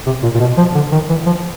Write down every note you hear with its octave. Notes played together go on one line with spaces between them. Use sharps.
C3
A#2
A#2
B2
F3
D3
D#3
E3
F3